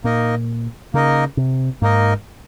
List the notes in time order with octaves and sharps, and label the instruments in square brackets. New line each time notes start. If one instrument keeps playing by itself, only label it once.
[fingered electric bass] A#2 [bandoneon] A#3 D#4 A#4 D#5
[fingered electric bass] C#3 [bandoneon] A#3 D#4 A#4 D#5
[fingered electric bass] C3
[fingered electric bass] G#2 [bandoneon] A#3 D#4 A#4 D#5